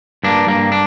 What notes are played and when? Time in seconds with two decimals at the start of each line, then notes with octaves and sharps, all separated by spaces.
0.24 G2 A#3 D4
0.47 G2 A#3
0.72 D4